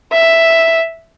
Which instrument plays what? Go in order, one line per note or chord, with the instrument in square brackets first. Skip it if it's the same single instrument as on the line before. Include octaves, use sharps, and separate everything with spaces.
[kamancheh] E5